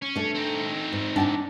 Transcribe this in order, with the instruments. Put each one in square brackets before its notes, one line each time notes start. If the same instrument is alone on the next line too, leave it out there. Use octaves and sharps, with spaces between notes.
[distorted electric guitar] C#4
[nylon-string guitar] A3 D4
[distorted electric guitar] C4 D#4
[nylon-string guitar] G#2
D4 G5 A5